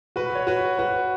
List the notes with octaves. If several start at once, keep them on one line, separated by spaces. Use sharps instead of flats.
F#4 B4
C#5
F#4 B4
F#4 B4